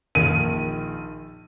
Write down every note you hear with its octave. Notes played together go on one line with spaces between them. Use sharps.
A#1 D#3 D#7